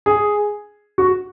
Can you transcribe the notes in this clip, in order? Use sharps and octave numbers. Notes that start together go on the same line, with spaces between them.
G#4
F#4